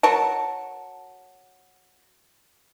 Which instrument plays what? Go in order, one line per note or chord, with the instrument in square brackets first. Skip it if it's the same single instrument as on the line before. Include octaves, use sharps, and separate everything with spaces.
[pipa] F#3 A#4 A5